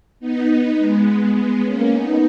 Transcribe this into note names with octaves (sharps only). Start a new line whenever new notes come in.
B3 D#4
G#3 B3
G#3 B3
A#3 C#4
B3 D#4